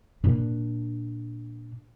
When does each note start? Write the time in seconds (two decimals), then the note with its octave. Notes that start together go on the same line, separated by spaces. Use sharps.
0.24 A#2 D4